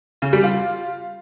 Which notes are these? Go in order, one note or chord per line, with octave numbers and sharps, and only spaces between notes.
C#3
G3
F4